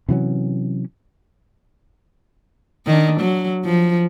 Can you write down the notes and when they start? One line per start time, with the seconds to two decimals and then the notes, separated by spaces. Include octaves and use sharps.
0.09 C3 E3 F#3 C#4
2.86 D#3 D4
3.21 F#3
3.65 F3